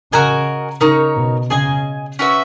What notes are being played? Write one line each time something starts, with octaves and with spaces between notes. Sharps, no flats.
C#3 F#4 A#4 D#5 G#5
C#3 D#4 A#4 C#5
B2
C#3 G#4 D#5 G#5
C#4 F#4 B4 E5